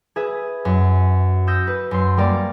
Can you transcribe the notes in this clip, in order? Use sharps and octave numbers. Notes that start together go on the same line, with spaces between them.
G#4 B4 E5
F#2
D#6 E6 G6 A#6
B4
F#2 C6
G3 A#3 A#4 D5